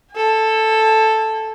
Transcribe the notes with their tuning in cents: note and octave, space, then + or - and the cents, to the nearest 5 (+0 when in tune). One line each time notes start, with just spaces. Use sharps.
A4 +0 G#5 -40